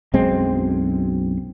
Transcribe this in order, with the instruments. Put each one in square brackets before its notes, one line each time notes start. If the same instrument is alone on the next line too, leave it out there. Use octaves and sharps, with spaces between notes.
[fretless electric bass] B1 F#2 G#3 C4